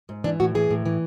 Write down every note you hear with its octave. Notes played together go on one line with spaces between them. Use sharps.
G#2
E3 D4
A2 F#4
E3 G#4
A2
E3